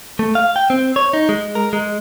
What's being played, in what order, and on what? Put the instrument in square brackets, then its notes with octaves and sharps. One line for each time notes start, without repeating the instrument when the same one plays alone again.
[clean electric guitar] A3
F5
G5
C4
C#5
D#4
G#3
A#4
G#3